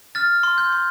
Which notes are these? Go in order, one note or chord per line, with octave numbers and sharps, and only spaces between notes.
F6 A6
C6
G6
C6